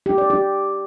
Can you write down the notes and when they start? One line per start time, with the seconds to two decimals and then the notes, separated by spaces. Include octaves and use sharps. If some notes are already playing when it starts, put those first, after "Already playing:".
0.06 G4
0.18 D5
0.30 G4